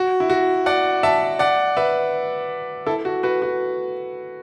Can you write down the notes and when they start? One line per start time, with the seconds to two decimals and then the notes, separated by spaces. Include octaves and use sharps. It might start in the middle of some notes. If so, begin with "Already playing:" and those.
Already playing: F#4
0.20 E4
0.30 F#4
0.66 D5 F#5
1.03 E5 A5
1.39 D5 F#5
1.77 B4 E5
2.87 E4 A4
3.05 F#4
3.23 F#4 B4
3.42 F#4